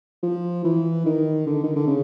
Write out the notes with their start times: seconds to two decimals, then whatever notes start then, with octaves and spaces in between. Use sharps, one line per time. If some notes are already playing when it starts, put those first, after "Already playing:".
0.23 F3
0.64 E3
1.06 D#3
1.46 D3
1.64 D#3
1.76 D3
1.87 C#3